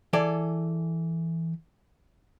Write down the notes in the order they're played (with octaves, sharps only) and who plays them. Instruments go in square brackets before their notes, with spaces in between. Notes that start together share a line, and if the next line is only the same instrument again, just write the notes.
[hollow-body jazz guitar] E3 G#4 A4 D5